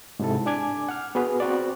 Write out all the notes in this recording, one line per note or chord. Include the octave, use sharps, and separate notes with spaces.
G#2 C3 E4 A4
D4 G#5 D6 G#6
F#5 F6
B3 F#4 G#4 B4
C4 F#4 D5